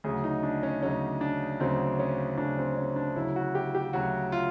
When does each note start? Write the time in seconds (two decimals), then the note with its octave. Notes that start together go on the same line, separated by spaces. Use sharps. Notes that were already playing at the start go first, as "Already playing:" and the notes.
0.04 D2 C#3 F#3 G#4
0.24 D#4
0.43 D4
0.63 C#4
0.83 D2 C#3 F#3 C#4
1.21 D4
1.60 D2 C#3 F#3 C4
1.99 C#4
2.37 D2 C#3 F#3 D4
2.58 C4
2.78 C#4
2.96 D4
3.16 D2 C#3 F#3 E4
3.36 F#4
3.55 G4
3.75 G4
3.93 D2 C#3 F#3 F#4
4.32 F4